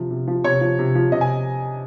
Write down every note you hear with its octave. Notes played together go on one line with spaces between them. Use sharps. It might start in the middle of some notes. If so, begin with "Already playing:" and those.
Already playing: C3 F3
C3
F3
C3 C#5
F3
C3
F3
C3 D#5
G#5